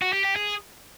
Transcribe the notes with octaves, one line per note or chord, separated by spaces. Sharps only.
F#4
G4
G4
G#4